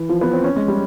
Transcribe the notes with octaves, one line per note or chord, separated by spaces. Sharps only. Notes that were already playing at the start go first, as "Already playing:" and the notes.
Already playing: E3
F3
B3
C4
C#4
G#3
G3